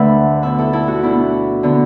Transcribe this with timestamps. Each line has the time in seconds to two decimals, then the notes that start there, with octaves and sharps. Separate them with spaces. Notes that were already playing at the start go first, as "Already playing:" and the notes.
Already playing: D2 D3 A3 D4 B4 E5 F#5
0.42 B2 B3 D4 B4 E5
0.58 E4 A4
0.73 E4 A4
0.88 F#4
1.03 B2 B3 D4 E4
1.63 D3 B3